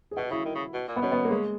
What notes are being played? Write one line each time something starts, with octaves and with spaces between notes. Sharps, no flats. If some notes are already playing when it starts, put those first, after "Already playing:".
G#4
B2 F#4
C#3 E4
D#3
C#3
B2
A#2
B3
B2 C#4
B3
A#3
C#3 G#3